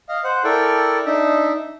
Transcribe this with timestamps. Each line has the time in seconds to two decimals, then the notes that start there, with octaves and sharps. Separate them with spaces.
0.09 D#5 F5
0.24 C5 F#5
0.44 E4 A4 A#4 D5 G5 C#6
1.06 D4 D#4 D#5 E5